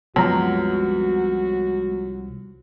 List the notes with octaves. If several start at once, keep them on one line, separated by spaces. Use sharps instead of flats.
C2 F#2 F3 F#3 G#3 B3 F#4 A#5